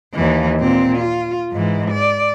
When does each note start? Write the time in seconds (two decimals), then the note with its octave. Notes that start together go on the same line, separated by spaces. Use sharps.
0.14 D#2 E3
0.60 A#2 C4
0.98 F4
1.53 G#2 E3
1.91 D5